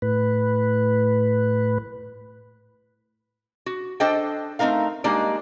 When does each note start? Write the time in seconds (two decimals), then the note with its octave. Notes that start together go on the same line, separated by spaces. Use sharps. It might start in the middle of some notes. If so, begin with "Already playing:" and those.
0.02 A2 B4
3.66 F#4
4.00 D4 A4 C5 D#5 G5
4.59 A3 C4 D#4 A#4 F5
5.04 G3 G#3 A#3 D4 D#4 D5